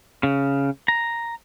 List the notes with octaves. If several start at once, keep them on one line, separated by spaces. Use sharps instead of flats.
C#3
A#5